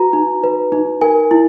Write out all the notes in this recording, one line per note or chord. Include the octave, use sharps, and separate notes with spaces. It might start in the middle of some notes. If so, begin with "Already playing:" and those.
Already playing: F#4 B4 A#5
D#4
B4
D#4
A#4 G#5
E4